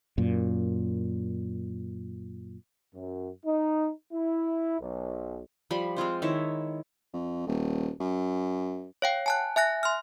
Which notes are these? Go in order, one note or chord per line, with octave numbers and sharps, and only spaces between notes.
F#2 A#2
F#2
D#4
E4
B1
F3 G3 B5 C6
G#3 C4 F4 C5
D#3 E4 C#5 E5
F2
D#1
F#2
C#5 F5 G5
G#5 A5 F#6
E5 G#5 F#6 A#6
C6 F6